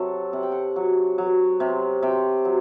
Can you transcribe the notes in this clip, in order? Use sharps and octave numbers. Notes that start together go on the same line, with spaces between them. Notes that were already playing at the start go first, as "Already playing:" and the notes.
Already playing: C3 F#3 A4
C3 F#5
G5
F#5
F#3
F#3
C3
C3 G5
F#3